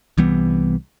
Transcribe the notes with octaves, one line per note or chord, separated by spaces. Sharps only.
C2 E3 G3 B3